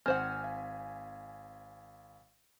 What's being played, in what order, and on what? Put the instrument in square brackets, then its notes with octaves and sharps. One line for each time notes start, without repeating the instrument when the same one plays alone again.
[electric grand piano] G#1 G#5 [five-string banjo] C4 C5 F#5 [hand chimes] F6
[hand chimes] F5